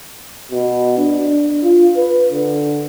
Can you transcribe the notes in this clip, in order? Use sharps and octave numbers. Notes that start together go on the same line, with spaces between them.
B2
D4
F4
B4
D3